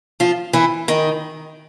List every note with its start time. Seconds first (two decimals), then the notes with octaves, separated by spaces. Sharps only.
0.20 F3 F4
0.53 E3 E4
0.88 D#3 D#4